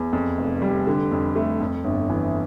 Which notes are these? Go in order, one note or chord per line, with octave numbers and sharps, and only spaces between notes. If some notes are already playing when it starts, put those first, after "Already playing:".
Already playing: E2
F2
F1
G3
D3
F2
A3
F2
G1
E3